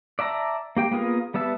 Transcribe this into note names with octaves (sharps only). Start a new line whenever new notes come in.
D5 E5 A5 A#5
A#3 G4 G5
A#3 B3 F4 G#4 A#4
G3 B3 E5 A5